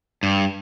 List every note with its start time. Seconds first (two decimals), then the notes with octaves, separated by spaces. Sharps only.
0.23 G2